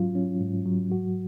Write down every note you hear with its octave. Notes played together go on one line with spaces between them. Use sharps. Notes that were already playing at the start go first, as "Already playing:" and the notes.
Already playing: G#2 F#3 C#4 F4
C#4
G#2
F#3
F#4